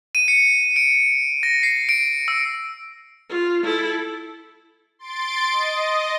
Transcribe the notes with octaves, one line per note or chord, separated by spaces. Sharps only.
D#7
C#7
D7
A#6
C7
D7
E6
F4
E4 A4
C6 A6 D7
D#5